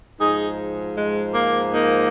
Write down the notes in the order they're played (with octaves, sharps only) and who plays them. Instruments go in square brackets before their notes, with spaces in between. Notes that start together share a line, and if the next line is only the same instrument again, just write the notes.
[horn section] G#2 F3 D#4 G#4
G#3
A#3
A#3 D#4